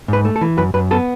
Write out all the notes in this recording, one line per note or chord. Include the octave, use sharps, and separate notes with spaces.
G#2 B4
A3
A4
E3
F#2 B4
F#2 B4
B3 A4